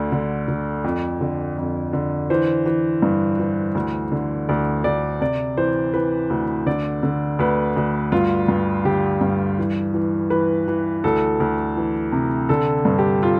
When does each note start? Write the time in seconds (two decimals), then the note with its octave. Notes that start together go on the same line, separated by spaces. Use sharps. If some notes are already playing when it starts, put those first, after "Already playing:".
Already playing: D2 D3 D5
0.12 D3
0.48 D3
0.84 F2
1.21 D3
1.58 F2
1.93 D3
2.30 E3 C5
2.66 E3
3.02 G2
3.40 E3
3.75 D2
4.12 D3
4.49 D2 D5
4.84 D2 D5
5.21 C3 D5
5.57 E3 C5
5.94 E3 B4
6.30 D2
6.66 D3 D5
7.03 D3
7.39 D2 B4
7.76 D2
8.12 G2 F4
8.48 G2
8.85 D3 G4
9.21 G2
9.59 E3
9.94 E3
10.30 E3 B4
10.68 E3
11.04 D2 A4
11.40 D2
11.77 E3
12.12 C3
12.49 D3 A4
12.85 G2
12.99 G4
13.23 F4